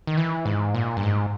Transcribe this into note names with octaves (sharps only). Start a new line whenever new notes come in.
D#3
E3
G#2
A#2
G2
G#2